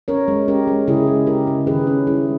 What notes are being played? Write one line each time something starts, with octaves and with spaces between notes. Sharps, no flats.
C#4 A#4 C#5
G#3
C#4 G4 A#4
G#3
C#3 E4 G#4
G#3
C#3 G4 A#4
C#3
D#3 G#4 B4
C#4
G3 E4 G#4